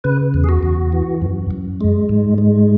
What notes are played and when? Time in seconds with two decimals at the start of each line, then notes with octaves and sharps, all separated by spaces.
0.04 C#3 B4
0.34 E2
0.44 G#4
0.49 F#4
0.63 E2
0.92 E3
1.22 F#2
1.51 F#2
1.81 G#3
2.09 G#2
2.38 G#3